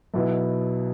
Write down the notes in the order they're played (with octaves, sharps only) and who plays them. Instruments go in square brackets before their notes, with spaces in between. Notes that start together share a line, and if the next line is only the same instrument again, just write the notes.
[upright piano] B1 B2 B3 E4